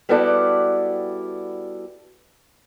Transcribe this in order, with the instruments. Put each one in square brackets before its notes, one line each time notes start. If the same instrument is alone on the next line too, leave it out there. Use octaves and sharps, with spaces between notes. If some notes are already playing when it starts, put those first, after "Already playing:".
[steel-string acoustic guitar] G3 B3 E4 F#4 A4 D5